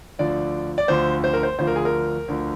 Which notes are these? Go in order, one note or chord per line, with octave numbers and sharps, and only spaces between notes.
D2 D3 F3 D5
D5
D2 D3 F3 C5
C5
A#4
C5
D2 D3 F3 C5
A#4
G#4
A#4
D2 D3 F3